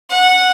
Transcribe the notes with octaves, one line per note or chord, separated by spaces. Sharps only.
F#5